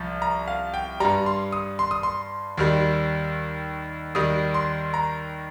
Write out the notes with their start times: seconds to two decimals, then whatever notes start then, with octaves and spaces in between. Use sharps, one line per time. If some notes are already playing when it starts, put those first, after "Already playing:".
Already playing: C2 F3
0.22 A#5
0.48 F5
0.74 G5
1.00 G2 G3 A#5
1.26 C6
1.52 D#6
1.79 C6
1.91 D#6
2.03 C6
2.58 D#2 D#3 G3
4.15 D#2 D#3 G3 D#6
4.54 C6
4.94 A#5